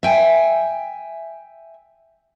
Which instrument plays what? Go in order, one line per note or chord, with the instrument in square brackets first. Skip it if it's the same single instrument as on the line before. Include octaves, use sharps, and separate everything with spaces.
[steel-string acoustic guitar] E5 G5 G#5